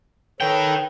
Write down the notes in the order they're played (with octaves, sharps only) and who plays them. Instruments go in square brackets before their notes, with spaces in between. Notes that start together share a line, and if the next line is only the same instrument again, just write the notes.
[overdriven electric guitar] D#3 G5 [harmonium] A4 B4 C#5